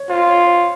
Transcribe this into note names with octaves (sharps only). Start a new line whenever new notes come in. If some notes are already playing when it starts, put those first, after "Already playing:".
Already playing: C#5
F4 C5
C#5
C5